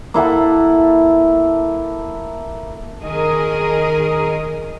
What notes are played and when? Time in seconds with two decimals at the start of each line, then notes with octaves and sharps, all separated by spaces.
0.14 A#3 E4 A4 F#5
3.04 D#3 G#4 A#4 D#5